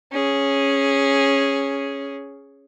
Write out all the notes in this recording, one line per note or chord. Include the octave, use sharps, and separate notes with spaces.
C#4 G#4